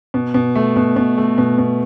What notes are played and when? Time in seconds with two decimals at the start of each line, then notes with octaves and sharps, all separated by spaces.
0.14 B2
0.34 B2
0.55 A3
0.76 B2
0.96 B2
1.18 A3
1.38 B2
1.58 B2